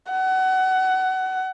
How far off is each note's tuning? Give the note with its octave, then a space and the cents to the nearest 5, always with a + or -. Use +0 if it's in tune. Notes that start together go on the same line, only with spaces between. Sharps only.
F#5 +25